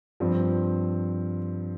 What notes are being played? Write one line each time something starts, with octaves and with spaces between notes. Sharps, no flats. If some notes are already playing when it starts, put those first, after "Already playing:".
G2 F3 C4